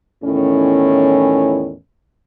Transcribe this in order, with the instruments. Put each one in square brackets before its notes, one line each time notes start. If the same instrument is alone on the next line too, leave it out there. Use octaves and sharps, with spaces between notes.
[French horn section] E2 A2 D#3 C#4